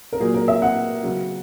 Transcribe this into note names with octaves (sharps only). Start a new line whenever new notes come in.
A#4
A#2 F#3 G#4
A#4
E5
F#5
C#3 F#3